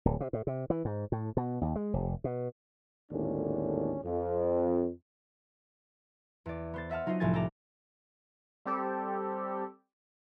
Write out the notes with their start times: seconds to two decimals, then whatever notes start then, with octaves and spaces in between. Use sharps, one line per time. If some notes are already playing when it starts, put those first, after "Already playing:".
0.05 D1
0.20 C3
0.33 A2
0.47 C3
0.70 E3
0.85 G#2
1.12 A2
1.37 B2
1.61 D#2
1.76 G#3
1.93 F1
2.24 B2
3.11 G#1 D#2 A2 D3 C#4 D4
4.04 F2
6.46 E2 D5
6.74 B3 C5 A6
6.90 D#5 E5 F#5 A5 F6
7.06 F#3 D#4 F4 F#4 C5 D#5
7.20 C2 A2 F3 A3 G#5 A6
7.34 A4 G5 A5 A#5 D6
8.65 G3 C4 G4 A4